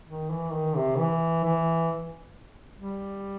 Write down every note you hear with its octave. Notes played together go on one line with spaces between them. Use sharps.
D#3
E3
D#3
C3
E3
E3
G3